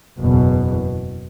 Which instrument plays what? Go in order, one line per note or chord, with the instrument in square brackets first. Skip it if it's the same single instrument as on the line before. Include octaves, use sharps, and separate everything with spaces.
[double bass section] F#1 E2 B2